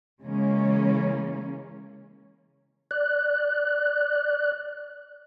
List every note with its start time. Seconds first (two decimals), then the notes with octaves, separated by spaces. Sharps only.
0.21 C#3 E3 G#3 A#3 C#4
2.91 D5 F#6